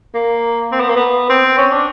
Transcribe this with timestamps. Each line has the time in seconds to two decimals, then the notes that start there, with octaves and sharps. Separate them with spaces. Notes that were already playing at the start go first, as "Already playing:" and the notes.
0.14 A#3
0.72 C4
0.80 B3
0.89 A#3
0.96 B3
1.29 C4
1.58 C#4
1.72 D4